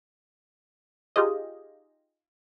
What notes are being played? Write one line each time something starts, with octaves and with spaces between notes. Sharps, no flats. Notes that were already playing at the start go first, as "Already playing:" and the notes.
D#4 F4 G4 G#4 D#5